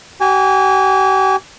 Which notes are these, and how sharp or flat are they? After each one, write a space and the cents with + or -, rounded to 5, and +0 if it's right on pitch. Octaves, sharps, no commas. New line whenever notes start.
G4 -45 G#5 -25